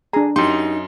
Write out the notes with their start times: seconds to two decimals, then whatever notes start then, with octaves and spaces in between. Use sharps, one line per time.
0.13 D4 G#4 A#5
0.36 F#2 D#4 G4 C6